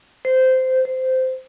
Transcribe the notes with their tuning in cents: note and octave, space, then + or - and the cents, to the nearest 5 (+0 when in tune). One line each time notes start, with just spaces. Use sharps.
C5 -15
C5 -15